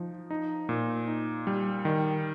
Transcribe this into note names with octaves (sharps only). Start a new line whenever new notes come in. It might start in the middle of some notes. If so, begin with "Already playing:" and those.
Already playing: F3 D#4
D#4
A#2
D#4
G3
D#3